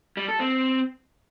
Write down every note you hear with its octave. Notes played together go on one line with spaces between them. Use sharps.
G3
A4
C4